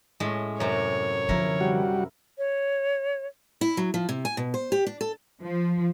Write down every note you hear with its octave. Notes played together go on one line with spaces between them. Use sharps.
A2 G#3 C#4
F#2 C3 C#5
D3 F3 E4 A#4
G3 F#4
C#5
E4
F#3
F3
C3
G#5
B2
C5
G4
D4
A4
F3